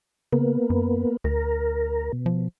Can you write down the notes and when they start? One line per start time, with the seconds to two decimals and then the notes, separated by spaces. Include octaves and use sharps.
0.33 C#3 A#3 B3
0.70 F#2
1.24 D2 A#4
2.13 B2
2.26 F3